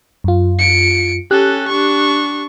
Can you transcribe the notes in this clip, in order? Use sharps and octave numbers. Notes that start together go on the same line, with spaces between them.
F#2 F4
C#7 D7
C#4 G4 A4 F#6
D4 C#6